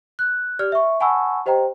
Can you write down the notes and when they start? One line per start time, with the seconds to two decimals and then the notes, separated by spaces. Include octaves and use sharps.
0.19 F#6
0.59 G4 D5 F6
0.72 E5 C#6
1.00 F#5 G#5 A5 B5 C#6 E6
1.46 G4 C5 D#5 G5 A#5